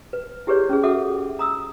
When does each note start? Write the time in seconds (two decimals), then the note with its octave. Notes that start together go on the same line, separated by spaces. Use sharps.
0.13 B4
0.47 E4 G4 G#4 B4 C#5 D5
0.69 C#4 G#4
0.83 F#4 A4 E5 F#5 D6
1.39 A#5 D#6 E6